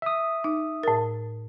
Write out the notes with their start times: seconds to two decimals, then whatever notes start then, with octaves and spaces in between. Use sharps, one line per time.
0.02 E5 D#6
0.44 D#4
0.83 A2 A#4